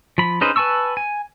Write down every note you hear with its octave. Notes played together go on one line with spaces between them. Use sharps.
F3 B5
C#4 D#4 G#4 B4 C5
B4 G#5 A5 C#6 E6
G#5